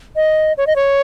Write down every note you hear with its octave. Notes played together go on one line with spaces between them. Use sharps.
D#5
C#5
D#5
C#5